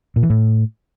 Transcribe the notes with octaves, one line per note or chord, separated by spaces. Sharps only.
A#2
E3
A2